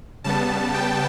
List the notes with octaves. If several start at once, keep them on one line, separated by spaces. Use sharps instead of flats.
C#3 G3 B3 A5
G5